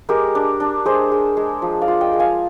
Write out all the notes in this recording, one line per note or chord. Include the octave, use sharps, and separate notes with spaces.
G#3 G4 A#4
D4
D4
G#3 G#4 C5
G#3
G#3
F3
D5 F5
F4
D#5 G5
G#3
F5 G#5